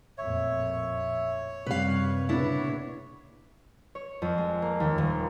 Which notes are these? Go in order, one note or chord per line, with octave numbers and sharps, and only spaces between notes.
A1 F2 A#2 C#5 E5
F#2 C3 G3 B4 F5
A#2 C#3 B3 D4 E4
C#5
F2
G#3
A#3
D#2
D#1